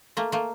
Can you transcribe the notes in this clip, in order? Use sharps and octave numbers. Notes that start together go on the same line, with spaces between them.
A3 A#3
A3 A#3